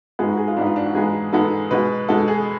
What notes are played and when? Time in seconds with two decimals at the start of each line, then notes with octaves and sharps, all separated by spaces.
0.19 G#2 G#3 B3 G#4
0.29 F#4
0.37 G#4
0.48 F4
0.57 G#2 G#3 B3 D4
0.66 F4
0.76 D4
0.86 F#4
0.95 G#2 G#3 B3 G#4
1.33 G#2 G#3 B3 A4
1.71 B2 G#3 B3 B4
2.08 B2 G#3 B3 A4
2.28 G#4